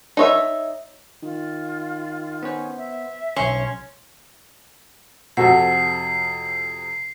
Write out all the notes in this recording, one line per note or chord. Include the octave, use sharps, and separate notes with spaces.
D#4 C#5 E5
D#3 F4
B3 C#4 C5
E5
B1 C#4 C6
F2 C3 F#4 A4 F#5 C7